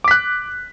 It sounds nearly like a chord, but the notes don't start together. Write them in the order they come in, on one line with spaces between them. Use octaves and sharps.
D6 B6 F#6